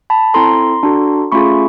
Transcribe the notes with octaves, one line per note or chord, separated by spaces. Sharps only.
A5 B5
C4 E4 A4 A#5 C6
D4 F#4 A4
A3 C#4 F4 G#4 B5 C#6